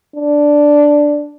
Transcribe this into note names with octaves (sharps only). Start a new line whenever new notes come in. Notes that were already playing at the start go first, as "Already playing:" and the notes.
D4